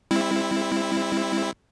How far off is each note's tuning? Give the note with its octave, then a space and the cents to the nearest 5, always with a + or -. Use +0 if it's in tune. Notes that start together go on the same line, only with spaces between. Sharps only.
G3 +40 C4 +0 E4 +0